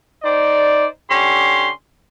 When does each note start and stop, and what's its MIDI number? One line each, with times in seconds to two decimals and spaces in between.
0.23 0.85 63
0.23 0.85 72
0.23 0.85 74
1.10 1.69 50
1.10 1.69 61
1.10 1.69 67
1.10 1.69 84